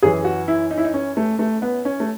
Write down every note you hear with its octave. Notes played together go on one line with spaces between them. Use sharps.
F#2 E3 G#4
F#4
E4
D#4
E4
D#4
C#4
A3
A3
B3
C#4
A3